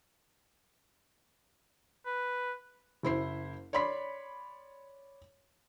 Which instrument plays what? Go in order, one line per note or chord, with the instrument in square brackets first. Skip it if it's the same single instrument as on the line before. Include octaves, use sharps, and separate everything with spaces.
[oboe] B4
[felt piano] F#1 E4 C5 C7
C#5 D5 B5 C6 B6